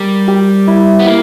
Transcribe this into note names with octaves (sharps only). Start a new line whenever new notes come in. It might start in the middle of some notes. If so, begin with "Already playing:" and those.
Already playing: G3 A#4
G4
E4
B3
A#3 E4